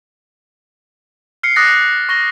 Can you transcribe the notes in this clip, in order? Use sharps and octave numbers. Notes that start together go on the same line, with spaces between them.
F6 C7 C#7
D6 D#6 F#6 A6 A#6
C#6 A#6 G7